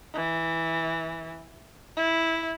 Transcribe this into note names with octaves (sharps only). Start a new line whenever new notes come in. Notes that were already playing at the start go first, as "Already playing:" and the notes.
E3
E4